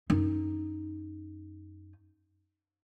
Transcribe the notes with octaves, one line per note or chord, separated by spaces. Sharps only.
F#2 D#4